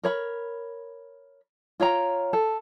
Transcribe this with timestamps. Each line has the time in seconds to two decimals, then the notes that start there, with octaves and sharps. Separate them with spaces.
0.04 A#4 C#5 B5
1.80 F4 C#5 G5 A#5
2.33 A4